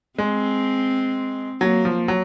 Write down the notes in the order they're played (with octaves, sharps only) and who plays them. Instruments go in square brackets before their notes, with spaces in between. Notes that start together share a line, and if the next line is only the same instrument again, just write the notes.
[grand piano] G#3 [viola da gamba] C4
[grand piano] F#3 [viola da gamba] A#3
[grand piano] F3
F#3